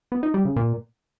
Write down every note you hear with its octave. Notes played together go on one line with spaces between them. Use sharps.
B3
D#4
G3
C#3
A#2